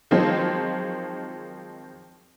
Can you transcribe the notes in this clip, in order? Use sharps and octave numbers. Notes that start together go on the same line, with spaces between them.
D#3 F3 F#3 G#3 C4